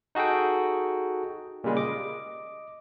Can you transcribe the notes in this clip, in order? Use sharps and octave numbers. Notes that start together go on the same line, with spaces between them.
D#4 F#4 G#4 A4 G5
A#2 C#3 G3 G#3
D#5 D6